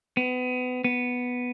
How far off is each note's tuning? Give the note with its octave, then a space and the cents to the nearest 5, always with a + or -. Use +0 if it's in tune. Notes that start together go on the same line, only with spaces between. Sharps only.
B3 +30
B3 +0